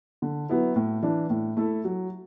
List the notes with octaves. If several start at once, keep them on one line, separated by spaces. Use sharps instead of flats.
D3
F#3 B3 E4
A2
E3 D4
A2
A3 E4 A4
F#3